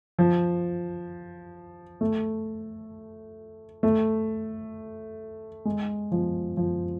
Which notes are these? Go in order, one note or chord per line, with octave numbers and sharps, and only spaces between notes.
F3
A3
A3
G#3
F3
F3